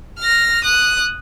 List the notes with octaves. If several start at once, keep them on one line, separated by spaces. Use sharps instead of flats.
F6 A#6
D#6 F#6